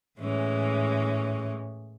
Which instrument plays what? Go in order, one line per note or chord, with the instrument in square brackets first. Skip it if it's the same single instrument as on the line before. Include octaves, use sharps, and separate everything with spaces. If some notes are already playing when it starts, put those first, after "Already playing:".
[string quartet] A2 E3 G#3 C#4